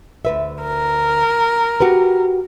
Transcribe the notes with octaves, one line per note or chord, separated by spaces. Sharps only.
D2 B4 E5
A#4
F#4 G4 B4